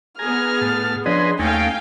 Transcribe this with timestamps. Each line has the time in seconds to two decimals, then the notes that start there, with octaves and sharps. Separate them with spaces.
0.19 B3 G#4 G#5 A#5 F6
0.61 A2 A5
1.06 F3 C#4 D4 G#4 B4 D#5 C6
1.39 D#2 A3 C#4 D#4 F5 G5 G#5